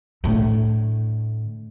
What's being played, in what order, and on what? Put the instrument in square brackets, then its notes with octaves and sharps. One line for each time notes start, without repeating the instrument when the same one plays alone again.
[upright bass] A2 D3